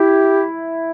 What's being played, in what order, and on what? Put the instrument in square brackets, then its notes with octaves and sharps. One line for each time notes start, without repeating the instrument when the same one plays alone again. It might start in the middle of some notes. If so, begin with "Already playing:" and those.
Already playing: [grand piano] E4 [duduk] G4